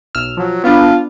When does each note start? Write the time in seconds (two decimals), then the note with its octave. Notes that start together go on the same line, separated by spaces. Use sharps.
0.15 B1 E6 F6
0.37 F3 F#3
0.64 B3 D4 F4